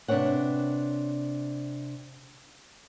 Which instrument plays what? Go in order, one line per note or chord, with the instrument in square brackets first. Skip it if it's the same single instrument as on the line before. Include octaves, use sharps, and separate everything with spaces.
[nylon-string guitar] C3 D4 B4 C#5 F#5